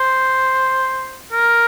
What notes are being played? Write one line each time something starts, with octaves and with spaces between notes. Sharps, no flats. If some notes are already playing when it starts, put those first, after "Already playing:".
Already playing: C5
A#4